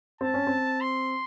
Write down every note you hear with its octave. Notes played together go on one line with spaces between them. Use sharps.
C4 A5
C#4
C4
C6